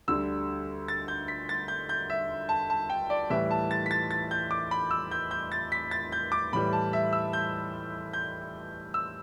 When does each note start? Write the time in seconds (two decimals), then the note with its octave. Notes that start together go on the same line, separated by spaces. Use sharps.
0.08 D2 D3 G3 E6
0.88 A6
1.08 G6
1.28 B6
1.49 A6
1.68 G6
1.89 G6
2.10 E5
2.49 A5
2.70 A5
2.90 G5
3.10 D5
3.30 A2 E3 G3 E5
3.51 A5
3.71 A6
3.86 B6
3.91 A6
4.11 A6
4.31 G6
4.51 D6
4.71 B5
4.91 E6
5.11 G6
5.31 G6
5.52 A6
5.72 B6
5.91 A6
6.12 G6
6.32 D6
6.53 A2 E3 G3 B5
6.73 A5
6.93 E5
7.13 E6
7.33 G6
8.13 G6
8.94 E6